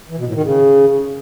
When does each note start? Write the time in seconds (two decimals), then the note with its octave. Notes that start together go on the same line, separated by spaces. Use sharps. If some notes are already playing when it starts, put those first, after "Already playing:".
0.09 E3
0.18 B2
0.26 A2
0.34 D#3
0.43 C#3